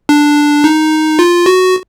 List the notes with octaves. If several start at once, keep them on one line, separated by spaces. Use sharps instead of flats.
D4
D#4
F4
F#4